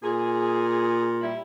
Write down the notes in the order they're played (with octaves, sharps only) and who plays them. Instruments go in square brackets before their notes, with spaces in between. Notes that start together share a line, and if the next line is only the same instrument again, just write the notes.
[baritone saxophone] A#2 [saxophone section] G#4
[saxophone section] G3 E4